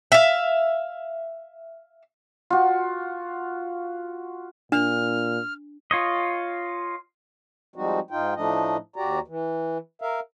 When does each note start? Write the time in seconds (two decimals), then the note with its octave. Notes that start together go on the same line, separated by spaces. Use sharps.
0.12 E5 F5
2.50 F4 F#4
4.72 A#2 D4 F6
5.91 F4 C#5 D#5
7.76 F3 G3 G#3 C4 D#4 F#4
8.11 G#2 D#4 F4 G5
8.36 A2 F3 A3 D4 D#4 D#5
8.96 D#2 F#4 G4 D5 A#5
9.28 E3
10.02 A#4 E5 F5